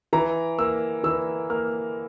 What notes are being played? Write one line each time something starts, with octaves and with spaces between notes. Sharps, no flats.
E3 A#5
A#3 E6
E3 E6
A#3 F6